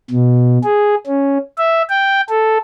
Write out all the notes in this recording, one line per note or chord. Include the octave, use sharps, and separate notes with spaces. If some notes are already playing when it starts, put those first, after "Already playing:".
B2
G#4
C#4
E5
G5
A4